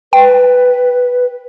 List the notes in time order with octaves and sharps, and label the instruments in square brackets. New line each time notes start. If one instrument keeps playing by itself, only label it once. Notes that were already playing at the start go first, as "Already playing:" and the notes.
[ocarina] B4 [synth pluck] G5